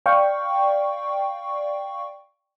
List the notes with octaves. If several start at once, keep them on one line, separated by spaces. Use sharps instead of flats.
D5 F5 G5 C#6